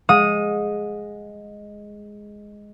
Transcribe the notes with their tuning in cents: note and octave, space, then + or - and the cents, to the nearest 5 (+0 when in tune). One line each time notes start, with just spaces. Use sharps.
G#3 +0 F#5 -45 D#6 +0